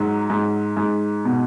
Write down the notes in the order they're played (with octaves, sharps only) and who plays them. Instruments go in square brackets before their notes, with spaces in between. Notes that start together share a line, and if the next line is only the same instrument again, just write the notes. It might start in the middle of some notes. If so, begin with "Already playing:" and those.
Already playing: [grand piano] G#2 F#3
G#2
G#2
B2